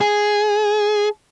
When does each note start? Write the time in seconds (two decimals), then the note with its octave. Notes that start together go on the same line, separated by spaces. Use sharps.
0.01 G#4